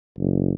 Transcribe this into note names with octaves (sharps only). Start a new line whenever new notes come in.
F#1